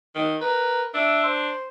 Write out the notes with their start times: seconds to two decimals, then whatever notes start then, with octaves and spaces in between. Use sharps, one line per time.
0.15 D#3
0.41 A#4 B4
0.94 D4 E5
1.24 C5